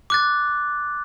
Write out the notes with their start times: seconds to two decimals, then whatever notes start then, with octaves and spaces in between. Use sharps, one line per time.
0.10 D6 F#6 A6